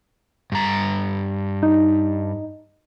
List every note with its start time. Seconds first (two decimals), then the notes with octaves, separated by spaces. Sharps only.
0.52 G2 A#5
1.63 D#4